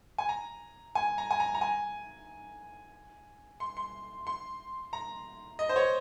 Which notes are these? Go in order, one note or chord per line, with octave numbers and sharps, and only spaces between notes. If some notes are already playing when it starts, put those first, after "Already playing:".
G#5
A#5
G#5
A#5
G#5
A#5
A#5
G#5
C6
C6
C6
A#5
D#5
C5
C#5